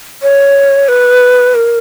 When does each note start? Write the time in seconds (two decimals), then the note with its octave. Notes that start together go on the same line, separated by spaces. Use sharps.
0.22 C#5
0.88 B4
1.55 A#4